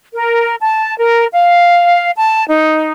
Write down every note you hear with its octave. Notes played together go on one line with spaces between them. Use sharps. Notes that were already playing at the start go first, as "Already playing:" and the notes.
A#4
A5
A#4
F5
A5
D#4